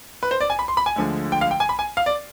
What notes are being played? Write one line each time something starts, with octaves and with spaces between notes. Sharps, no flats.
B4
C5
D5
G#5
B5
C6
B5
G#5
D2 D3 F3 G#3
G5
F5
G5
G#5
B5
G#5
F5
D5